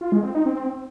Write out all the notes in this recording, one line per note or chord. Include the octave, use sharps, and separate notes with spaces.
F4
G#3
C4
D#4
C4